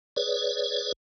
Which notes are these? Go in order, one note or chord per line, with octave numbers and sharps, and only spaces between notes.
G#4 B4 C#5 D5